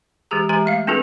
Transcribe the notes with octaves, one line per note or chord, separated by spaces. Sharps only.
E3 G#3 G4 G#4 A#5
E3 G#3 G4 G#5 A#5
A3 E5 F5
C4 D4 F4 G#4 A4 B4